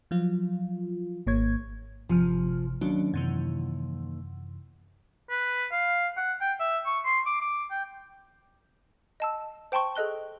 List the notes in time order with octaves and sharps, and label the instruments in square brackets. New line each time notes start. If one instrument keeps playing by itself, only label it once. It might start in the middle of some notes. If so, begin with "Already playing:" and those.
[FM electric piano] F3 F#3 F4
G#1 A#3 C#5 G#6
[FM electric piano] G1 C3 F6 [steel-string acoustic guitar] F3
[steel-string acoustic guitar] D#2 [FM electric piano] F#3 C#4 D4
[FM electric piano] F#2 C3 E3
[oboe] B4
F5
F#5
G5
E5
C#6
C6
D6
D6
G5
[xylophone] D#5 A5 E6
C5 G5 A5 C6 C#6
G#4 A4 D#5 F#6 G7